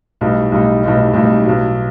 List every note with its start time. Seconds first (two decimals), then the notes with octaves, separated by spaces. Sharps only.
0.21 B1 A2 G3 D#4
0.52 B1 A2 G3 D#4
0.83 B1 A2 G3 D#4
1.14 B1 A2 G3 D#4
1.45 B1 A2 F#3